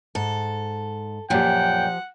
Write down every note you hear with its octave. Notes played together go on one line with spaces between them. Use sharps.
G#2 A4
F#2 A#2 F3 G4 F#5 G5